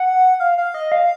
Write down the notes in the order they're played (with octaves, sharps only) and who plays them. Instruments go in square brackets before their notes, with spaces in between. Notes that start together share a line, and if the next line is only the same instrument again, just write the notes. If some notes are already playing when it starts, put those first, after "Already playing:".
Already playing: [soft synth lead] F#5
F5
F5
D#5
F5